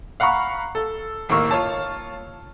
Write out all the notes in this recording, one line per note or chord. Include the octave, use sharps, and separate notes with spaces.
F5 F#5 A#5 B5 C#6
A4
D#1 G#1 A2 A#3 C#6 E6
F4 C#5 A5